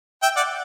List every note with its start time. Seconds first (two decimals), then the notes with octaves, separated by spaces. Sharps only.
0.23 E5 G5
0.36 D5 F#5